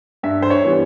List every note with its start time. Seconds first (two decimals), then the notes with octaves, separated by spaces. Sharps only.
0.23 G2 E5
0.42 C5
0.50 C#5
0.64 E3 G3 B3